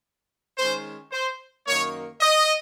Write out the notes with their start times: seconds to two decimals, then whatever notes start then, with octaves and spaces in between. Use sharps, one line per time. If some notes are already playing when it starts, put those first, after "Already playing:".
0.58 D#3 G#3 C#4 C5
1.12 C5
1.67 F#2 D#3 A#3 C#5
2.21 D#5